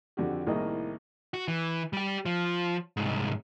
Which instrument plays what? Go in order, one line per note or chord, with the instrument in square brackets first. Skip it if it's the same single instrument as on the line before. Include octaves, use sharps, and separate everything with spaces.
[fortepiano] F2 D3 F#4 G4
C2 A2 D#3 A#3 G#4 D#5
[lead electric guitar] F#4
E3
G3 G4
F3
C2 G#2